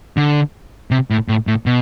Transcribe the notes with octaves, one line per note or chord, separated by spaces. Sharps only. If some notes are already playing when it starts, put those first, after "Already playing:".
D3
C3
A2
A2
A2
B2